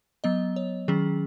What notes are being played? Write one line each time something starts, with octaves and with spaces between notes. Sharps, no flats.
F#3 B3 D#5
C#5
D#3 F#3 C#4 G#4